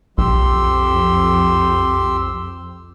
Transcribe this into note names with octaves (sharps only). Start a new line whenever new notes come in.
B1 F2 G4 C6 E6